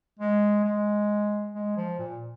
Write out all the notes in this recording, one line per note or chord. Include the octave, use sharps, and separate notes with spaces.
G#3
G#3
G#3
F3
A#2